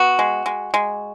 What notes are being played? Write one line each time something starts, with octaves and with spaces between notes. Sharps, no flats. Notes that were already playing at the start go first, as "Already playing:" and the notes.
Already playing: B3 F#4
G#3
G#3
G#3